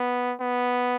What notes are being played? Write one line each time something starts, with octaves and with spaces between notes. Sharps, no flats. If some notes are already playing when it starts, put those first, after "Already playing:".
Already playing: B3
B3